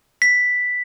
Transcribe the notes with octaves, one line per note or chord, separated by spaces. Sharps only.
B6